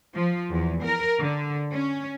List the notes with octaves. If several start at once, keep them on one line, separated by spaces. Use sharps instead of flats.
F3
E2
A#4
D3
C#4